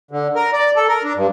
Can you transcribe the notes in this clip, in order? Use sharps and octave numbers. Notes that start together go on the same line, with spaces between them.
D3
A#4
D5
A4
A#4
D4
G2